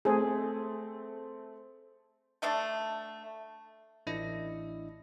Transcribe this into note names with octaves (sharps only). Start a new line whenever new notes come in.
A3 C4 G#4
D3 A3 D4 D5
A1 D4 E4 D#5 A#6